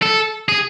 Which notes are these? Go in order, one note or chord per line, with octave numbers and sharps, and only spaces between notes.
A4
G#4